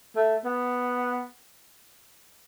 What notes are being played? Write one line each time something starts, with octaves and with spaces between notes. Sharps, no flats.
A3
B3